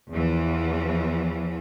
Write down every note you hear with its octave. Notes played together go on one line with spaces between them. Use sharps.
E2 E3 F3